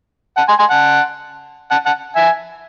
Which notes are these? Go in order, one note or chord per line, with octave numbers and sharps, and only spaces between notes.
F#5 A5
G#5 C6
G#5 C6
F#5 A5
F#5 A5
F#5 A5
E5 G#5